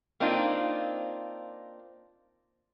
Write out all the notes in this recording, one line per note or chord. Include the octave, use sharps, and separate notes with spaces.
A#3 C4 D4 D#4 F4